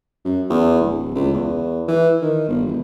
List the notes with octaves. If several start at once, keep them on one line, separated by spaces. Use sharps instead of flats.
F#2
E2
D1
C#2
E2
E3
D#3
G1
E1